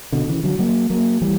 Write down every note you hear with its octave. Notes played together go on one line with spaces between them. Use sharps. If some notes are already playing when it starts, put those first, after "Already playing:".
B2 D3
C#3 E3
D3 F#3
F#3 A#3
F#3 A#3
E3 G3